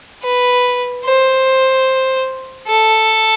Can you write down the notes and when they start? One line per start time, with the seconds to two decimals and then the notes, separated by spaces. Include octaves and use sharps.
0.23 B4
1.04 C5
2.67 A4